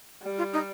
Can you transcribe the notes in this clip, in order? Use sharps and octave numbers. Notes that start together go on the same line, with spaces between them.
G3
F4
D#4